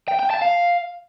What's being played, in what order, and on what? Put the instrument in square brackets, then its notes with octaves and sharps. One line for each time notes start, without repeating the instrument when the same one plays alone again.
[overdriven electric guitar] G5
G5
A5
F5